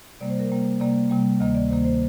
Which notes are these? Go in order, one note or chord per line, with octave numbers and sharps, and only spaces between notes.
C3 G3 A#3 D5
C5
A#4
C3 G3 A#3 C5
C3 G3 A#3 D5
C3 G3 A#3
D2 C3 D#3 A#3 D#5
D5
D2 C3 D#3 A#3 C5
C5